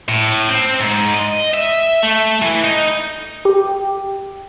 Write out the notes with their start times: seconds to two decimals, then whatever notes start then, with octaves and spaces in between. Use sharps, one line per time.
0.09 A2
0.49 C4
0.80 G#2
1.15 D#5
1.54 E5
2.03 A3
2.42 E3
2.64 D#4
3.45 G4